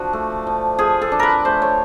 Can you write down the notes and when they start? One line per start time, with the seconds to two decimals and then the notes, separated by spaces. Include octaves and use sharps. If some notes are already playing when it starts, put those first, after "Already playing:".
Already playing: F3 D4 F#4
0.13 A3
0.47 F3
0.78 F3 G#4
1.02 A4
1.12 D4
1.19 A#4 B4
1.45 A3 C5
1.62 C#5